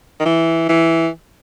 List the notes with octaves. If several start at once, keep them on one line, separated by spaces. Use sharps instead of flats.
D#3
E3
E3